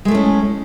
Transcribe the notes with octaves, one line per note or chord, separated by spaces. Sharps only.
A2 G#3 A3 C#4